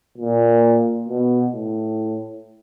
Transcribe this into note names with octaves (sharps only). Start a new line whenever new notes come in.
A#2
B2
A2